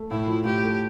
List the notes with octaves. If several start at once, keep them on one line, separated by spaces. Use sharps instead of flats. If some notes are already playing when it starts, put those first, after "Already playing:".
Already playing: A3
A2 E4
F3
A2 G4
A3